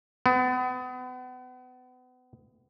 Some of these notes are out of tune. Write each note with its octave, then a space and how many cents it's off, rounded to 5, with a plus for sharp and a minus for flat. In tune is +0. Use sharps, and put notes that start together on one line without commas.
B3 +35